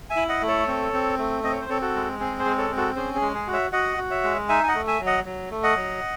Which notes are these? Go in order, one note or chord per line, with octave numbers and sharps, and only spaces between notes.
E5 G#5
E4
D#5 F#5
A3
A4 C#5
C4
C4
A3
C4 D#5
C#5
C5
C4 A4 C#5
F#4 A4
G#3
C4 G#4
G#4 C5
G#3
A4 C#5
C4
F#4 A4
C#4 G#4 C5
G#4
G#3
G#4
F#4
C#5 E5
F#4 D#5 F#5
F#4
C#5 E5
G#3
D#4 E5 G#5
G#5
D#5 F#5
A3
E5 G#5
F#3
D#5 F#5
F#3
A3
D#5 F#5
F#3